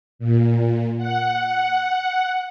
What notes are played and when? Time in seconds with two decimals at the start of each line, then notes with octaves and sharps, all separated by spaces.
0.19 A#2
0.97 F#5